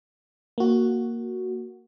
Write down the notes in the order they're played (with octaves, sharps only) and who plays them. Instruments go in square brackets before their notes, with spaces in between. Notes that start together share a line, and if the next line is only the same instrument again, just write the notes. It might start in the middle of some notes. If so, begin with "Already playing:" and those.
[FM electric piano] A#3 F#4